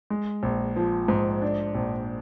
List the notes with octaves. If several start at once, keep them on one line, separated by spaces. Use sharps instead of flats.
G#3
A#1
F3
G#2
D4
A#1